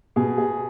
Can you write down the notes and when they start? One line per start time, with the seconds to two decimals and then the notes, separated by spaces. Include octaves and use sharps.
0.16 B2 G#4
0.38 G#4